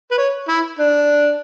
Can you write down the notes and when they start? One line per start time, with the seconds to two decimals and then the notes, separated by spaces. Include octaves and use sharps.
0.11 B4
0.18 C#5
0.49 E4
0.79 D4